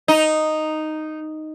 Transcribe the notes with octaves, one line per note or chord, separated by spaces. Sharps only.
D#4